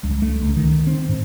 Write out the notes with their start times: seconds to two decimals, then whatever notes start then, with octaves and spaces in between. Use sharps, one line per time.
0.04 C#2
0.22 A3
0.42 C#2
0.56 D#3
0.87 C4
1.09 G#2